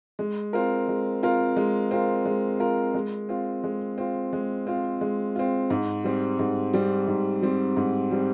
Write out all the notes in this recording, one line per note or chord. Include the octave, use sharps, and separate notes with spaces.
G#3
C4 F4 A#4
G#3
C4 F4 A#4
G#3
C4 F4 A#4
G#3
C4 F4 A#4
G#3
C4 F4
G#3
C4 F4
G#3
C4 F4
G#3
C4 F4
G#2
G3 C4
G#2
G3 C4
G#2
G3 C4
G#2
G3 C4